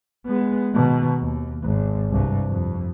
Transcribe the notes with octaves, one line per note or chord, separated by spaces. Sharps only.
G#3 B3
B2 D#3
D#2
G#1
C2 G2
F2